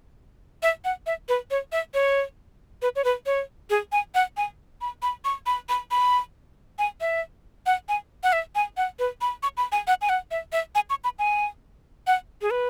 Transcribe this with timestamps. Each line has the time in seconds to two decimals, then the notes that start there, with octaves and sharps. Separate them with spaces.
0.63 E5
0.85 F#5
1.07 E5
1.29 B4
1.51 C#5
1.72 E5
1.94 C#5
2.82 B4
2.96 C#5
3.04 B4
3.26 C#5
3.70 G#4
3.92 G#5
4.15 F#5
4.37 G#5
4.81 B5
5.02 B5
5.25 C#6
5.46 B5
5.69 B5
5.91 B5
6.79 G#5
7.01 E5
7.66 F#5
7.89 G#5
8.23 F#5
8.33 E5
8.55 G#5
8.77 F#5
8.99 B4
9.21 B5
9.43 C#6
9.57 B5
9.72 G#5
9.87 F#5
10.01 G#5
10.09 F#5
10.31 E5
10.52 E5
10.75 G#5
10.90 C#6
11.04 B5
11.19 G#5
12.07 F#5
12.42 G#4
12.51 B4